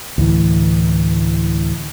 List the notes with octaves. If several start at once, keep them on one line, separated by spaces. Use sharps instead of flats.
D2 A2 E3